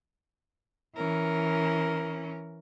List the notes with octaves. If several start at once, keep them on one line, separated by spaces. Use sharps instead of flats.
E3 C#4 A#4